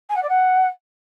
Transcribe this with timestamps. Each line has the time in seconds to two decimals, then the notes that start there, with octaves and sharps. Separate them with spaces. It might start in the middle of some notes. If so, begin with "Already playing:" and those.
0.09 G#5
0.16 F#5
0.22 D5
0.29 F#5